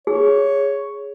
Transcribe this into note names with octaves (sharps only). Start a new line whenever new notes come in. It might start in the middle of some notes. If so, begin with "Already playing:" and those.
G#4 C#5